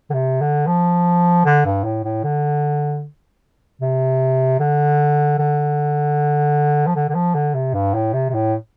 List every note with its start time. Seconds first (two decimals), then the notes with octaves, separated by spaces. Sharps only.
0.10 D3
0.14 C3
0.41 D3
0.67 F3
1.46 D3
1.66 G2
1.84 A2
2.04 A2
2.24 D3
3.81 C3
4.60 D3
5.39 D3
6.87 F3
6.96 D3
7.09 D3
7.15 F3
7.35 D3
7.54 C3
7.74 G2
7.95 A2
8.14 C3
8.30 C3
8.34 A2